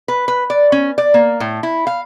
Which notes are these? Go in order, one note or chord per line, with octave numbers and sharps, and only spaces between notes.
B4
B4
D5
C#4
D5
A#3
A2
E4
F5